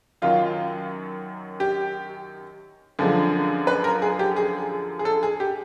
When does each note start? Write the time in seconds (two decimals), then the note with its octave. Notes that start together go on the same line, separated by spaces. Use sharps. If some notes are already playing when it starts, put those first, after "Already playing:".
0.22 F#2 D#3 F#3 F4
1.60 G4
2.99 F#2 D3 F3 G#3
3.67 B4
3.84 A#4
4.02 G#4
4.19 G4
4.36 G#4
4.99 G#4
5.05 A4
5.23 G#4
5.40 G4